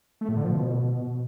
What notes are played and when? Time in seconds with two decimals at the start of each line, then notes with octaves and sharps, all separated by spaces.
0.21 A3
0.29 A2
0.37 D3
0.44 F3
0.52 B2